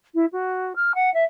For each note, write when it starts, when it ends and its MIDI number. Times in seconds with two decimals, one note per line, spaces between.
0.14 0.25 64
0.32 0.73 66
0.76 0.92 89
0.94 1.12 78
1.14 1.24 76